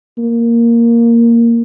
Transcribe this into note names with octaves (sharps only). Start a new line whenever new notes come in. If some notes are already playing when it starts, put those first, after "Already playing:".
A#3